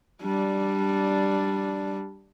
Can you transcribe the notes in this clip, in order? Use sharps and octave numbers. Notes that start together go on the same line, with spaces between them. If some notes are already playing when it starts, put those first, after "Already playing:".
G3 D4